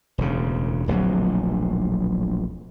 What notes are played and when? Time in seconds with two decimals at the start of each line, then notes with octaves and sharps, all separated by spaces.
0.18 E1 D2 C#3
0.88 D1 A#1 B2 F#3